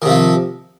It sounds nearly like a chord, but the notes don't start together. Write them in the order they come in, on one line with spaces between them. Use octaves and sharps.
D#3 C3 F3